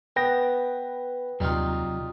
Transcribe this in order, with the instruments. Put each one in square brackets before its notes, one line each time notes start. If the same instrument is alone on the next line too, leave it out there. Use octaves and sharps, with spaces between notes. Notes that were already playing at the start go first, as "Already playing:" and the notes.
[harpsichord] B3 [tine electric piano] B4 G5 A#6
[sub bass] D#2 [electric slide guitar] C3 F#3 [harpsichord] G3 D#4 F4